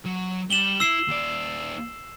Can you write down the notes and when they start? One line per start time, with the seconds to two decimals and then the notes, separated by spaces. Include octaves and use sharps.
0.06 F#3
0.50 G3 E7 F#7 G7
0.80 E4 E6 C7 E7
1.08 D#2 D5